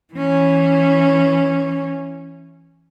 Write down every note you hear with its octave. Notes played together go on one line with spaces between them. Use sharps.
E3 C#4